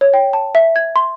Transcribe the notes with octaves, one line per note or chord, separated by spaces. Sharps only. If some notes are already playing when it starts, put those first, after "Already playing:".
C#5
G5
A5
E5
G#6
C6